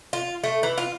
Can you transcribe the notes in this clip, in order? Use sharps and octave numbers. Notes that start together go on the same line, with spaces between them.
F4
A3
E3
F4